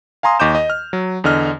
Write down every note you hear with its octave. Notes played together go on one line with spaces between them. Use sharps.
F5 G#5 A#5 C6 D#6
D#2 D#5 C#6 D6 G6 E7
D#5
F6
F#3
E2 D3 D#5 F6